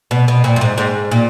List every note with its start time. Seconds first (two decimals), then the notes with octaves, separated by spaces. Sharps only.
0.11 B2
0.28 B2
0.44 A#2
0.56 F#2
0.61 G#2
0.78 G#2
1.11 A#2